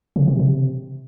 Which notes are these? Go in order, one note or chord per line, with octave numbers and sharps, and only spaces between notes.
C#3
C3
C3